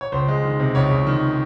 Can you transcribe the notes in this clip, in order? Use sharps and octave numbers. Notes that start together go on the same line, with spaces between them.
C#5
C#2 C5
G#3
D#3
C3
C#2 C#5
C#2
D#3